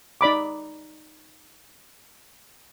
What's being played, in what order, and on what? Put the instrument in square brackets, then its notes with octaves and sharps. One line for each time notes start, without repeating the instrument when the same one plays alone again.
[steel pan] D#4 D5 B5 D6